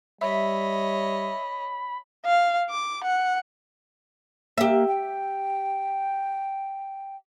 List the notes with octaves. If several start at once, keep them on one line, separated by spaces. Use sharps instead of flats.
G3 C#5 D#5 E5 B5
F5
D6
F#5
A#3 G4 E5
G5